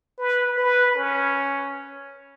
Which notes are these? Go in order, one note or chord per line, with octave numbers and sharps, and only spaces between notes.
B4
B4
C#4